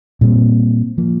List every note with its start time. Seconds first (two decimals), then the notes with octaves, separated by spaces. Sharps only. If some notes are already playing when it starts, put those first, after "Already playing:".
0.21 A#2 G3 C4
0.98 F3 A#3